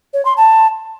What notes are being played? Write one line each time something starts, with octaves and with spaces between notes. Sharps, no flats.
C#5
C6
A5